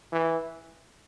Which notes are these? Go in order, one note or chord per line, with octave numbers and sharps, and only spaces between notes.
E3